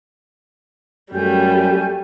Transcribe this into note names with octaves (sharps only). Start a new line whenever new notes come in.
F#2 G3 A3 G5 G#5 G6